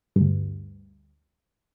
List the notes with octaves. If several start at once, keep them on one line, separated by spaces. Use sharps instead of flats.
D2 G2